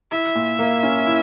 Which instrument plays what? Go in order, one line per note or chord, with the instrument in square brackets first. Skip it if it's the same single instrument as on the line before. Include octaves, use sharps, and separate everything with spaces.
[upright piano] E4 [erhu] E5
[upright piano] A#2
A#3
C#4
E4